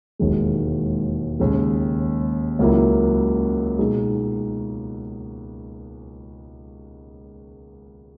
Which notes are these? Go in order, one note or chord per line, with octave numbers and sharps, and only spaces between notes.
E1 D#2 D#3 G#3
D#2 C#3 G#3
C#2 C#3 F#3 A#3 E4
B2 G#3 D#4 G#4